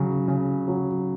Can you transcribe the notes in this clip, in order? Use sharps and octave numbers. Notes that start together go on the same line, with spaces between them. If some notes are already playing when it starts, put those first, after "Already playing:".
Already playing: C#3 F#3
C#3
F#3